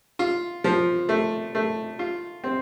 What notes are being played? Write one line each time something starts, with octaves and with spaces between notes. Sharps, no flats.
F4
F3
A3
A3
F4
C4